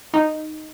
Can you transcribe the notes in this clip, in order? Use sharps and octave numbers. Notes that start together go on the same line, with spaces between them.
D#4